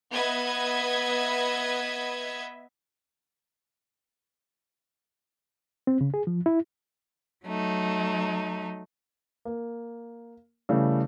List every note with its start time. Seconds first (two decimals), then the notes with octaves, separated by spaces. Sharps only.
0.11 B3 B4 D#5 E5 G#6
5.87 C4
6.01 C#3
6.14 G#4
6.27 F3
6.46 E4
7.45 F#3 A3 D#4
9.45 A#3
10.69 C#3 E3 G3 A3